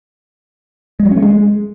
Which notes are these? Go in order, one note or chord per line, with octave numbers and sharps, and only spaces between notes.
G#3
F#3
C#4
A3
G#3